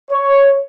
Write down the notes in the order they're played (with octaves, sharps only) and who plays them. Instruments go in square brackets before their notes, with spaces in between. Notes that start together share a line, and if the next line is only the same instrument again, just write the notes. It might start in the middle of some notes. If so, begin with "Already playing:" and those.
[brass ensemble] C#5